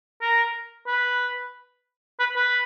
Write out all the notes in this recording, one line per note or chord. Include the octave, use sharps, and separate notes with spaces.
A#4
B4
B4
B4